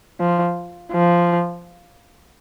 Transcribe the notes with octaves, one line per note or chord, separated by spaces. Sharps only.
F3
F3